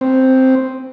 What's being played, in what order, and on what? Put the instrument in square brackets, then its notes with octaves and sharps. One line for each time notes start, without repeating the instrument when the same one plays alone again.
[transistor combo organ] C4